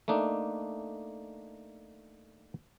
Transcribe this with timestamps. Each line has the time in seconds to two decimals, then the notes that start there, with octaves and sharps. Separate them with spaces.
0.08 A3 A#3 D4 D#4